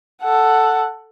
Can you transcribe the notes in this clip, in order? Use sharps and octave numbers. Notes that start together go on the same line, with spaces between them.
A4 F#5